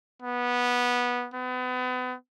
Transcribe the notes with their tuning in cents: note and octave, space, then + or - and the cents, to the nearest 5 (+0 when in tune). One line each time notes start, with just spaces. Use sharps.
B3 -15
B3 +35